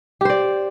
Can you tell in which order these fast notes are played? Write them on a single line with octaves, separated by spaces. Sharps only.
G4 C5 D5